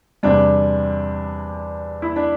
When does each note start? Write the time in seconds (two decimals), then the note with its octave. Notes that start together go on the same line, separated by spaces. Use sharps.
0.23 E2 C3 G3 D4
2.02 E4
2.16 D4